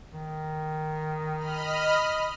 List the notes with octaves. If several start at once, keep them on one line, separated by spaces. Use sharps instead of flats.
D#3
D#5 B5 F6